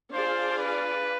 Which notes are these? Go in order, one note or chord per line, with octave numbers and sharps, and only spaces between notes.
D4 F4 G#4 C5 D5 F5
B4